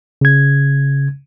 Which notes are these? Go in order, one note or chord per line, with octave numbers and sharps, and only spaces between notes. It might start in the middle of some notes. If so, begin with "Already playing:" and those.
C#3 G#6